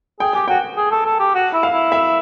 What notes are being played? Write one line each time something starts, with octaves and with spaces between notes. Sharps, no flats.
G#4 G5
G4 G#5
F#4 G5
G#4
A4
A4
G4
F#4
E4
F5
E4
E5